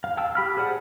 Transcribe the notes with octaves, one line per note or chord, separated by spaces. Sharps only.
F5
F5 G5 A5 E6
G4 B5 F6
G#4 C5 D5 F#5 A5